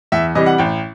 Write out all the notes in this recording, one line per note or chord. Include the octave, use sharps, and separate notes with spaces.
E2 E5
C3 E3 G3 D#5
F#5
A1 G5